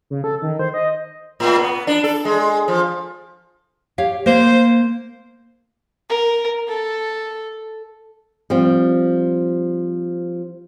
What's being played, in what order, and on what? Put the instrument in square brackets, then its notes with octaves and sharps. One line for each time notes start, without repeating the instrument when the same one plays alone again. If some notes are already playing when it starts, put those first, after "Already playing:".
[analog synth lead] C#3
A4
D#3
C5
D#5
[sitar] A2
B3
D4
A4
G#3
F3
[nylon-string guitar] G4 C#5 F5
[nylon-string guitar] A#3 [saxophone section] C5
[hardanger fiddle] A#4
A4
[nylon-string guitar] F3 G3 C4